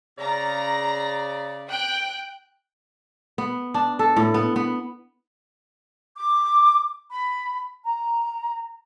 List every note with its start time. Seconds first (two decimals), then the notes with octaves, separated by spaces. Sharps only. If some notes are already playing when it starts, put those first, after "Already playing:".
0.19 C#3 D5 A#5
1.70 G5 F#6
3.38 B3
3.74 D4
3.99 A4
4.16 A2
4.34 B3
4.56 B3
6.16 D6
7.11 B5
7.84 A#5